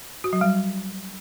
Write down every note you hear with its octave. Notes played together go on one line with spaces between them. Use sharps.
F#4
F#3
G3